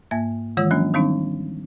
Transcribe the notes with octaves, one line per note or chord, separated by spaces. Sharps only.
G#2 A#3 E5 G#6
D#3 E3 G#3 F4 C#5 E6
F3 F#3 G#3 A#3 C#4 D4
D#3 G3 C4 D4 D#4